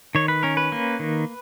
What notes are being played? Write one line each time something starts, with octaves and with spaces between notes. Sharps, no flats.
D#3 C#5
B4
C#4 A#4
B4
A#3
D#3